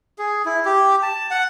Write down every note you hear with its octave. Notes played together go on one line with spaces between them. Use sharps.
G#4
E4
G4
A5
F#5